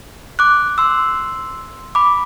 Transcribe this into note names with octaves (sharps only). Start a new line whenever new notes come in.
D6 F#6
C6 E6
B5 D6